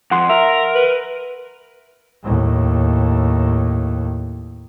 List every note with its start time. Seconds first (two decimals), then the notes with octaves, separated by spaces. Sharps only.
0.11 F2 F#5 C6
0.30 A#4 E5
0.75 B4
2.23 D#2 A2